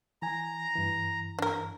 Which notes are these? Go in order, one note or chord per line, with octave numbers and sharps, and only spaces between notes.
E3 G#5 A#5
G2 E3
D4 A#4